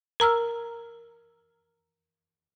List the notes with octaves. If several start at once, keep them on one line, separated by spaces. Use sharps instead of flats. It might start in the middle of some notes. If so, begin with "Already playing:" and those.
A#4 A#5 E6 F6